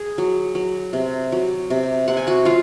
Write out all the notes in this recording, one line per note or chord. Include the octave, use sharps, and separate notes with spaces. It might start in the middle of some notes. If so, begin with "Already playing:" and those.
Already playing: G#4 G#5
F#3
F#3
C3
F#3
C3
C3 F#5
G#5
F#4 F#5
F#3 F4 F5